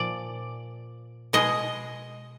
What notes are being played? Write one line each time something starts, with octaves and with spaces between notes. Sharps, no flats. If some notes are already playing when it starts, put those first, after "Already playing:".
Already playing: A#2 F3 D5
B2 G#3 D#5